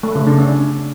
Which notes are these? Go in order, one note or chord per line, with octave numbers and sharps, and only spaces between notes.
A3
C#3
D4
C#4